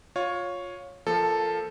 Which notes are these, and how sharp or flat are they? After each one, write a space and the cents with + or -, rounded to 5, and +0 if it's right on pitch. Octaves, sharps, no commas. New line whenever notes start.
F4 +20 C#5 +0
F3 -15 A#3 +0 A4 +0